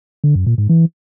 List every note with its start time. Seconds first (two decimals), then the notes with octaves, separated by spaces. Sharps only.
0.24 D3
0.35 F#2
0.47 A#2
0.58 G#2
0.69 E3